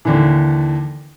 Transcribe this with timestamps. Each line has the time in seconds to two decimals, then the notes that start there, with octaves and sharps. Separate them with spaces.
0.05 D#2 D3 E3